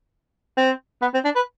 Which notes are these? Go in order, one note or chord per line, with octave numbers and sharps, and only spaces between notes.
C4
B3
C4
D4
B4